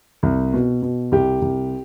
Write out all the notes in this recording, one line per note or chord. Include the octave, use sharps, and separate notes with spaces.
C2
B2
B2
C2 G4
C2